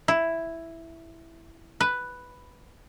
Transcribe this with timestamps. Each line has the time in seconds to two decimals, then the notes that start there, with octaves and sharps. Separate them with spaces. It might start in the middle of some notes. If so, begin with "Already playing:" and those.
0.08 E4
1.80 B4